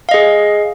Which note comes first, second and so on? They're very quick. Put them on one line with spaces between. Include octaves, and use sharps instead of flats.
F5 D#5 G#4